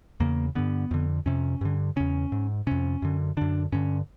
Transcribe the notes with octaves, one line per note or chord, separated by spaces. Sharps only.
E2 C#3 A#3
G2 D3 B3
F2 D3
F2 C3 C#4
G2 D3
E2 C#3 C#4
G#2
F2 C3 C#4
F#2 D3
F#2 D3 D4
G2 D3 C#4